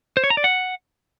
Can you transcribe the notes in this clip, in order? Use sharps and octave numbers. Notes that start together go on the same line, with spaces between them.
C5
C#5
A#5
D5
F#5